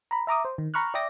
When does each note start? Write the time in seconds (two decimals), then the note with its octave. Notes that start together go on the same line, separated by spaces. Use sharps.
0.11 A#5 B5
0.27 E5 A#5 D6 D#6
0.45 C5
0.58 D#3
0.74 A#5 B5 C#6 F6 F#6
0.94 D5 E5 G5 D6 D#6 A#6